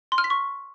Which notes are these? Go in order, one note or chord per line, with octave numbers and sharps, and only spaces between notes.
C6
F6
B6
C#6